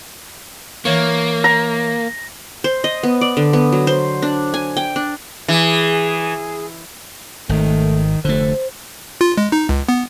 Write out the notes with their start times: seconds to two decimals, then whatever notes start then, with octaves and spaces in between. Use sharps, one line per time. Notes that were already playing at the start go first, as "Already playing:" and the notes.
0.85 E3 A#3 C#5
1.44 A#5
2.64 C5
2.84 D#5
3.03 B3
3.21 D5
3.37 D3
3.53 B3
3.72 F#3
3.87 C5
4.22 D4
4.54 G#5
4.77 G5
4.96 D4
5.48 E3 G#4
7.49 G#1 D#3 A3
8.25 F1 D3 A3 C5
9.21 F4
9.37 G#3
9.52 D#4
9.69 C#2
9.89 B3